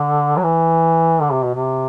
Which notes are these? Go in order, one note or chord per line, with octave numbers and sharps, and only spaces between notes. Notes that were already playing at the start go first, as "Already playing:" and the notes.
Already playing: D3
F#3
E3
D3
C3
B2
C3